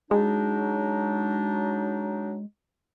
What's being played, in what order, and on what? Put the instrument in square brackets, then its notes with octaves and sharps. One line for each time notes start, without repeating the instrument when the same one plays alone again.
[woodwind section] F#3 D4 D#4 [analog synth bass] G#3